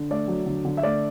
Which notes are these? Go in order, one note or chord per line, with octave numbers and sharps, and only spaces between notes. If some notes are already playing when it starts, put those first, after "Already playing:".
Already playing: D3
A3 D5
F#3
D3
D3
E5
A3 D5